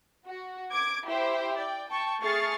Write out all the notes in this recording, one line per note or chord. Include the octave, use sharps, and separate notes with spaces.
F#4
D6 G#6 D7
E4 G4 C5 G5
D5 G5
G5 A5 C#6
A3 G#4 C#6 F6 A6 C7